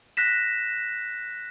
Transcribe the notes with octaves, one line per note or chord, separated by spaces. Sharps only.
F#6 A#6 B6 E7